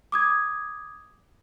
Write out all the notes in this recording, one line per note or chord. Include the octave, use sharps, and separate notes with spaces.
D6 D#6 G#6